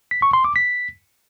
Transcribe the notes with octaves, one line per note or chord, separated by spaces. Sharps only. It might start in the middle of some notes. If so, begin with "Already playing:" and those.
B6
C#6
C6
D6
B6